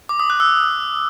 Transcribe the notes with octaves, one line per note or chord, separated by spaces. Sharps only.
D6
D#6
F#6
E6